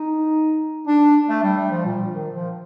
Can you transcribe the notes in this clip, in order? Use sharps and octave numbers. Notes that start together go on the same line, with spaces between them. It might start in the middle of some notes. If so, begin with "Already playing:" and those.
Already playing: D#4
D4
A3
G3
G3
F3
A#2
D#3
F3